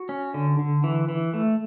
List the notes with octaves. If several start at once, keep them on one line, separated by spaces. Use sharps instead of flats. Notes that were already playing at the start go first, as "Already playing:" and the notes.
Already playing: F#4
C#4
D3
D3
E3
E3
A3